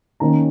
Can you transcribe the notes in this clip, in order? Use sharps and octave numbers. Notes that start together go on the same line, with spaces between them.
D#3 A#3 C#4 A#5